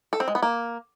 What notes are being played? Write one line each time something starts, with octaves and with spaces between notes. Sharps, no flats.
A4
C4
G#3
B3
A#3